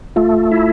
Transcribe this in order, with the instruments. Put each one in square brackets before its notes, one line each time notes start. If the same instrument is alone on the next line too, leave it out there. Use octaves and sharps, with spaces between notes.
[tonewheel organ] A3 [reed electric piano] F4
[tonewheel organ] E4